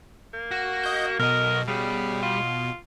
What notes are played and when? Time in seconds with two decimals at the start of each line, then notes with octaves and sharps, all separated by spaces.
0.33 A#3
0.51 F#4
0.84 D#5 G6
1.19 B1 B2 A#4 D#5
1.68 C#3 G3
2.22 F4